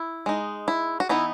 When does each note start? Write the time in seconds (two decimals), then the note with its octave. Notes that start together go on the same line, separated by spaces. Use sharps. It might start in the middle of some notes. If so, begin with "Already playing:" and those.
Already playing: E4
0.26 G#3 D#4
0.68 E4
1.00 F#4
1.09 E3 B3 D#4 E4